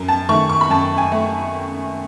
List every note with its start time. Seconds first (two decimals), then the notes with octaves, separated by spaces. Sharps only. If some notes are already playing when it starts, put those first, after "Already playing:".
Already playing: F#2
0.08 A5
0.29 D#3 A3 C#6
0.49 C#6
0.61 B5
0.70 F#2 A5
0.98 G#5
1.12 A3